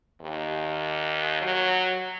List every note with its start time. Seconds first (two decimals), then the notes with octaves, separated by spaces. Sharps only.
0.21 D#2
1.41 F#3